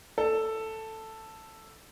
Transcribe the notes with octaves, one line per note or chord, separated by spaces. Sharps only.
A4